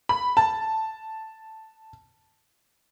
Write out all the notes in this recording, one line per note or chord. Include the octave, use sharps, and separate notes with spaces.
B5
A5